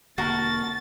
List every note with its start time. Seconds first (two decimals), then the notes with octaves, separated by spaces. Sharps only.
0.18 E1 D3 A#3 F#4 A#4 A5 A6